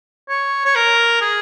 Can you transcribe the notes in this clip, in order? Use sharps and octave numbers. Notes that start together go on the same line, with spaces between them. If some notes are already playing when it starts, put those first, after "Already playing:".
C#5
C#5
A#4
G#4